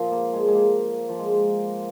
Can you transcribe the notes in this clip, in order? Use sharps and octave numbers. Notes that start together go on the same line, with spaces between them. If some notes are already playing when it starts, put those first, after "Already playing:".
Already playing: A#2 F3
A#3
G#3
G#3
A#3
F3
G#3